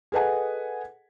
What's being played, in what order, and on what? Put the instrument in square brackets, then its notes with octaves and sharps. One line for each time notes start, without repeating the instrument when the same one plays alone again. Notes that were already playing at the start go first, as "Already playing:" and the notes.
[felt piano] G#4 A4 B4 D#5 F#5 G#5